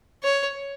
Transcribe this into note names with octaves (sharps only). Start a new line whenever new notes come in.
C#5